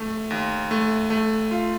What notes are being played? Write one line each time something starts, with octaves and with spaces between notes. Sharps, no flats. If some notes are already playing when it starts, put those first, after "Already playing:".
Already playing: A3
D#2
A3
A3
F4